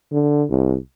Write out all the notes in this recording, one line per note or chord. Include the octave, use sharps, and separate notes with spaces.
D3
C2